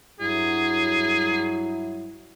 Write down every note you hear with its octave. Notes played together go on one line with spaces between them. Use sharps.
G2 F#3 E4 G#4